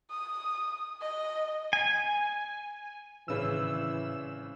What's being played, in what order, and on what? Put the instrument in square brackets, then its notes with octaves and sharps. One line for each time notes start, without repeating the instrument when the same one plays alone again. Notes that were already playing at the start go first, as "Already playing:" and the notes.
[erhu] D#6
D#5
[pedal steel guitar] G#5
[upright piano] G#1 C#3 B4 [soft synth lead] A2 [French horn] E3 [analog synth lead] E6